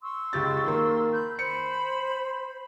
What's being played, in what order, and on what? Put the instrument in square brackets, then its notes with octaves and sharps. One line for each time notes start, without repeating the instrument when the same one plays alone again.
[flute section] C6 C#6 E6
[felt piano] C#2 G4 A6
D#3 A#3
[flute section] B5 G6
[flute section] C5 B5 [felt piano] C#7